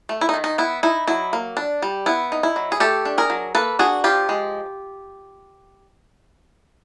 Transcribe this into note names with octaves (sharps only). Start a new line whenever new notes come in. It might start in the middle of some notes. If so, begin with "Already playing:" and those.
A3
E4
D#4
D#3
D#4
B3 E4
D#4 E4
F#3 E4
A#3
D4
G3
B3 E4
D#4
E4
F#3
G#4
A3 G4 A4
D4
G#4 A#4
F#3
A#3 A4 B4
D4 F#4 G#4
F3 F4 G4
G#3